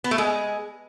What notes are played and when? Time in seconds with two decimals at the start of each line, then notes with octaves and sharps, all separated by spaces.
0.04 B3
0.11 A3
0.18 G#3